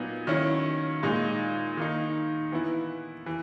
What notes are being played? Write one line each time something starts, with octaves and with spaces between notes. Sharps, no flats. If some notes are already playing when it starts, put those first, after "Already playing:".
Already playing: A#2 F#3 B3 D#4
D#3 F#3 C#4 E4
A#2 G#3 D#4
D#3 A#3 D#4
E3 B3 E4
E3